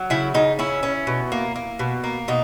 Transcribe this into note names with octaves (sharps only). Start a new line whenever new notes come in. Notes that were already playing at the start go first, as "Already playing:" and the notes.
Already playing: F#3
C#3 E4
C#3 D#4
C#4 E4
C#4
B2
A#3
A#3
B2
A#3
B2 D#4